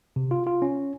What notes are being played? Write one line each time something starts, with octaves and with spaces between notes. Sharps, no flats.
C3
F4
F4
C#4